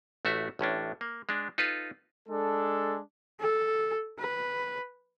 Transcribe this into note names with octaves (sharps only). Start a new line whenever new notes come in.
A1 A3 F#4 E5
A1 A2 C#4 D4
A#3
G#3 D4
D#4 F4 A4 B4
G#3 D4 A4
A4
B4